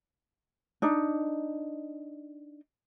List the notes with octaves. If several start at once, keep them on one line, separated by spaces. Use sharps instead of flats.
D4 D#4